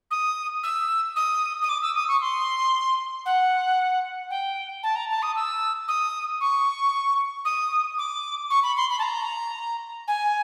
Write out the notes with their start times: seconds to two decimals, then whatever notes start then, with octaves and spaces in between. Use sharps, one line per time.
0.11 D#6
0.63 E6
1.16 D#6
1.62 D#6
1.69 D6
1.82 E6
1.95 D#6
2.08 C#6
2.21 C6
3.25 F#5
4.30 G5
4.83 A5
4.95 A#5
5.10 A5
5.22 D#6
5.36 E6
5.88 D#6
6.40 C#6
7.45 D#6
7.98 D6
8.50 C#6
8.63 B5
8.76 C6
8.90 B5
8.99 A5
9.02 A#5
10.07 G#5